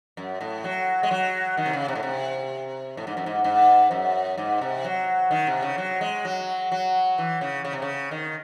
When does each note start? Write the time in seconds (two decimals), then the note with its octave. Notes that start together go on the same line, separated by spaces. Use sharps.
0.17 F#2
0.41 A2
0.64 F#3
1.03 G#3
1.11 F#3
1.57 D#3
1.66 C3
1.73 C#3
1.88 C3
1.95 A2
2.03 C3
2.97 A2
3.07 G#2
3.17 F#2
3.26 G#2
3.44 G#2
3.91 F#2
4.38 G#2
4.61 C3
4.84 F#3
5.31 D#3
5.47 C3
5.62 C#3
5.78 F#3
6.01 G#3
6.25 F#3
6.72 F#3
7.18 E3
7.41 C#3
7.65 C#3
7.73 C3
7.82 C#3
8.11 D#3